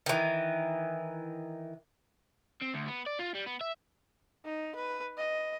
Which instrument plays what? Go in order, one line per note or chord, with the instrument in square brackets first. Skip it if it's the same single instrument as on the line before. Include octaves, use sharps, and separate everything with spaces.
[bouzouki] D#3 E3
[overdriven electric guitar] C4
D2
B3
D5
F4
G3
B3
E5
[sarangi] D#4
B4
D#5